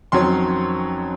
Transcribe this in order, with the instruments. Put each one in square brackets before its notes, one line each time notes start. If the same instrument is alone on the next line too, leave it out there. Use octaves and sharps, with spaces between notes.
[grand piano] F2 D#3 F#3 C#4 C6